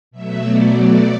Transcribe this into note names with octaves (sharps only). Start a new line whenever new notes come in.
B2 F#3 A3 E5
D5
D5